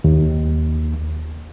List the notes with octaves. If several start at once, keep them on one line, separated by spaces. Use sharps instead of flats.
D#2